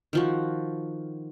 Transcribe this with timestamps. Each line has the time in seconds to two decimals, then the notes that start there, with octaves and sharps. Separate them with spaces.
0.13 D#3 F3 F#4